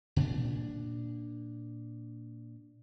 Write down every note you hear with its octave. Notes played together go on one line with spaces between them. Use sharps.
A#2 D4